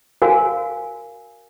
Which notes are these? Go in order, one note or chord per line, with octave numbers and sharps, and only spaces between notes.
F#4 A#4 F5 G#5